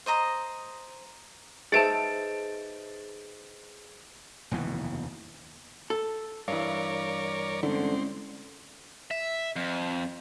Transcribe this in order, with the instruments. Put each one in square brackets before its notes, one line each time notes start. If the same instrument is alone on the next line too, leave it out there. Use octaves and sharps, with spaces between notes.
[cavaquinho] C5 D#5 A#5 D#6
[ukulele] D#4 E5 A5 [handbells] G#4 B4 C5 [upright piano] A6 D7
[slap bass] F1 D#2 B2 E3
[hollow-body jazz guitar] A4
[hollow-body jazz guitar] G2 E3 [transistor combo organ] A#4 C#5 D5 [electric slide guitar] F5
[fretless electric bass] D3 [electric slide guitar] G#3 C#4 E4 [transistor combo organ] C4
[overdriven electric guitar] E5
F2